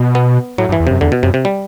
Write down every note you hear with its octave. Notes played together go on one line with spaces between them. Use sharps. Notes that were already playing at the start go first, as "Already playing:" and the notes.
Already playing: B2
B3
A2 F#3
G2
E3
E2
F#2 C3
E2 D3
B2
F#2 C3
C3
G3